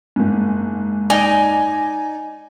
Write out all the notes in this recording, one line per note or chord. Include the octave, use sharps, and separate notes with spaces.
F#1 G#2
D#4 D5 G#5